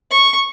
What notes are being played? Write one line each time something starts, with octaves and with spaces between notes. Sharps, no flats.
C#6